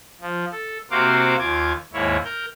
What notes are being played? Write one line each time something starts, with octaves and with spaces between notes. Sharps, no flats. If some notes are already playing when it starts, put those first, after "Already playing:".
F3
A4
C3 A#3 F#4 C5 F5 D6
D#2 F4 D6 G#6
D#2 G#2 A#3 E4 C#5
A#4 G6